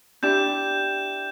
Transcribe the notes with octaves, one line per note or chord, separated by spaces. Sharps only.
D4 E4 G4 G6 E7